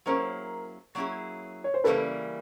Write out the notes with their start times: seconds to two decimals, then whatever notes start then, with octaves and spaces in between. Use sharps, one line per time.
0.06 F#3 A#3 C#4 E4 G#4 A#4 C5
0.95 F#3 A#3 C#4 E4 G#4
1.64 C#5
1.74 C5
1.84 C#3 E3 G3 A#3 C#4 A4 B4